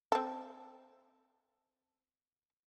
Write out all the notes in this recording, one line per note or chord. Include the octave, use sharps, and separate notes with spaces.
C4 A4